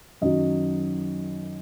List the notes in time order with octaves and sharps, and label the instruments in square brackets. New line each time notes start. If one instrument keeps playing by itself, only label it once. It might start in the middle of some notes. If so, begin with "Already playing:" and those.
[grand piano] F#2 D#3 F#3 D#5